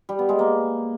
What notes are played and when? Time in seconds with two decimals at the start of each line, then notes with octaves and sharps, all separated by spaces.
0.09 G3
0.19 B3
0.29 G#3
0.39 A#3